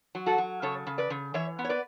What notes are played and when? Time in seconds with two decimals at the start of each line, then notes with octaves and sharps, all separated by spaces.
0.15 F#3
0.26 F#4 A4
0.38 F#3
0.62 C#3 A4 C#5
0.87 C#3
0.98 B4 D5
1.10 C#3
1.34 E3 C#5 E5
1.59 B3
1.64 C#5
1.69 B4 D5